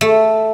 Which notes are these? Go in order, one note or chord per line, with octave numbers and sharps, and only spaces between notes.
A3